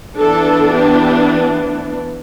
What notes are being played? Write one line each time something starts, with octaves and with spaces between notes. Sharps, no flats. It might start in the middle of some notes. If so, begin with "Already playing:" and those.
E3 B3 D4 A4
G4